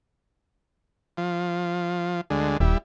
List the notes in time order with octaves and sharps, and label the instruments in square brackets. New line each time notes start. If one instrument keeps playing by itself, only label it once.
[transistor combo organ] F3
D2 D3 G#3
[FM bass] D#1 [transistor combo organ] G3 E4